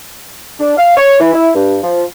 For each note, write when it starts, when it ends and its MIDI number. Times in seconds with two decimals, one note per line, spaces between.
0.59 0.73 62
0.78 0.95 77
0.97 1.17 73
1.20 1.32 52
1.33 1.49 64
1.55 1.77 43
1.82 2.03 53